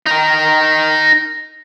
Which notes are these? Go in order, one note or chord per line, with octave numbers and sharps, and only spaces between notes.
D#4 A#4